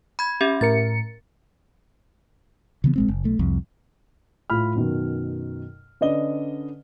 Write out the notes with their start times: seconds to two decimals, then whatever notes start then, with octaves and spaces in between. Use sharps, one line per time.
0.19 B5 G#6
0.41 C#4 G4 E5
0.61 A2 A#4 A6 C#7
2.84 C#3 E3 B3
2.96 A#1 G#3 C4
3.08 F#1
3.24 B1 A3
3.39 C2 F2
4.50 A2 F4 B5 F6
4.75 F#2 B2 D#3
6.01 D3 C#4 B4 D5 D#5 G7